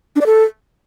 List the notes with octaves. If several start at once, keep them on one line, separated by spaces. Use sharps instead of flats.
D4
D5
A4